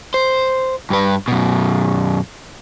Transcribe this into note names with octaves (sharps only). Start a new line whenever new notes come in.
C5
G2 B4
F#2 B2